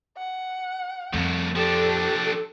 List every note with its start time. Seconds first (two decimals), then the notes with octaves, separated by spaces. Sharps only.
0.17 F#5
1.14 C2 F2 A2
1.56 F3 D4 G4 A4